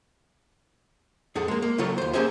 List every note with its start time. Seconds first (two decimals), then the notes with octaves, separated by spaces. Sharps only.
1.35 F2 G#4 A4 F#5
1.48 G#3 A#3
1.62 A#3
1.78 B1 C#3 F#3 F4 A4 C#5
1.98 D#2 C5
2.13 A#3 C#4 G4 G#4 C5 E5